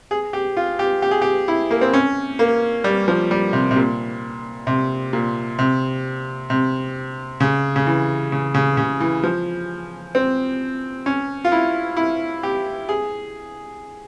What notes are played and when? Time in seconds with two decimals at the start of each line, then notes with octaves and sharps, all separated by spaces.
0.11 G#4
0.33 G4
0.57 F4
0.79 G4
1.02 G4
1.11 G#4
1.22 G4
1.48 E4
1.71 A#3
1.81 C4
1.93 C#4
2.39 A#3
2.84 G3
3.08 F3
3.31 G3
3.53 C3
3.71 C3
3.76 A#2
4.67 C3
5.13 A#2
5.59 C3
6.50 C3
7.40 C#3
7.76 C#3
7.87 E3
8.32 C#3
8.54 C#3
8.77 C#3
9.00 E3
9.23 F3
10.15 C4
11.06 C#4
11.45 F4
11.52 E4
11.97 E4
12.43 G4
12.89 G#4